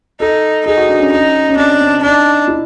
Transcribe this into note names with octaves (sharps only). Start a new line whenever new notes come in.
D#4 A4
D#4 G#4
F#4
D4
C#4
C#4 D#4
C#4
C4 D4
C4
D4 D#4
E4